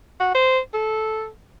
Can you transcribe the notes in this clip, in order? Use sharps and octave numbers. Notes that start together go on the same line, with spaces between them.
F#4
C5
A4